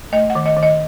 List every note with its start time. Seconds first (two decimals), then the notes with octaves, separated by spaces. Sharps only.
0.13 A3 D#5
0.30 F#5
0.35 D#3
0.46 D#5
0.56 D#3
0.63 D#5